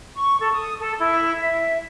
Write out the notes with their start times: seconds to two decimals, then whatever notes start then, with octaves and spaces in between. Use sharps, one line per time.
0.16 C#6
0.40 A4
0.52 D#6
0.81 A4
1.00 E4
1.40 E5